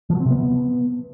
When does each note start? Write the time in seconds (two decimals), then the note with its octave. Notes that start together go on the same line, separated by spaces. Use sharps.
0.10 F3
0.15 F#3
0.20 C4
0.26 C3
0.31 B3